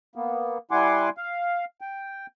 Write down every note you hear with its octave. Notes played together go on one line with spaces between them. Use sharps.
A#3 B3
G3 E4 F#5 G#5 C6 D6
F5
G5